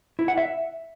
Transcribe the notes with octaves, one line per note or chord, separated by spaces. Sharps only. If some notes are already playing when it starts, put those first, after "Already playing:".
E4
F#5
E5